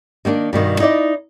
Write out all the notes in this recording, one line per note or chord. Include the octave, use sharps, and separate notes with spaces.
D#3 A#3 C4 D4
G2 B2 D#3 B3
D#4 E4 D5 D#5